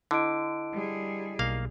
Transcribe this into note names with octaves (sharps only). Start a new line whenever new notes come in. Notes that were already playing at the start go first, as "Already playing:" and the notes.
D3 E4 D#5 D7
G3 G#4
B1 A#3 F5